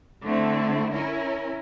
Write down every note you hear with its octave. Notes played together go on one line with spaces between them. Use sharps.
D3 A3 C4 E4
C#4 E4 A#4